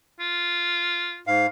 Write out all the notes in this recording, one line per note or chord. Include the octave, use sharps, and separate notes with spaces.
F4
G#2 F5